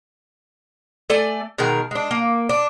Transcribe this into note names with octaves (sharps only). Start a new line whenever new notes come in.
A3 A4 D5 G#5
B2 D#3 G#3 A#4
G#3 D4
A#3
D4